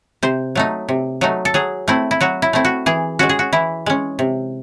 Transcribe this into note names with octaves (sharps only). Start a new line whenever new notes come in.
C3 C5
F#3 A3 D#4
C3
F#3 A3 D#4
A4
F#3 G#4
A3 C4 E4
E4
F#3 F#4
E4
A3 C4 E4
F#4
E3 G#4
G#3 C#4 F#4
G#4
F#4
E3 E4
G#3 C#4
C3